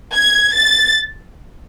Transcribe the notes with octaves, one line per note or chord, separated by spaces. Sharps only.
G#6
A6